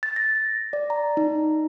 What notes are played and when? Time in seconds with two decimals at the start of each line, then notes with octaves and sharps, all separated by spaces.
0.03 A6
0.16 A#6
0.73 D5
0.90 A#5
1.17 D#4